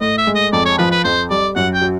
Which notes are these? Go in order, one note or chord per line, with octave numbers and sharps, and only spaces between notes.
A2 D#5
E5
G#3
D#5
F2 D5
C#5
F3 B4
B4
F2 C5
G3 D5
F#2 F#5
G5
F#3